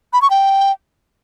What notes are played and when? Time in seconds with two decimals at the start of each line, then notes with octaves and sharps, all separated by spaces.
0.13 B5
0.22 C#6
0.30 G5